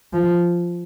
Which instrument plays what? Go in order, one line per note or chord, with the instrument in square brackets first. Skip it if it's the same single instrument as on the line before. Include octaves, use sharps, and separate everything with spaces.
[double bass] F3